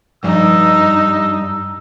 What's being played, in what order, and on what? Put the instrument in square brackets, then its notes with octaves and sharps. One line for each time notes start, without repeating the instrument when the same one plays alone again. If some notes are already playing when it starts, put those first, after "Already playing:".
[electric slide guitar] G2 [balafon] F3 [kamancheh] D#4 [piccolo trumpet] E6